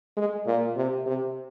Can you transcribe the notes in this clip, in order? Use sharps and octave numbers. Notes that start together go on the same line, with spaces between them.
G#3
A#2
C3
C3